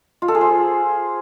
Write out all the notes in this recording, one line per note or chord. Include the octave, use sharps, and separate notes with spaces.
F4
A4
G#4
C5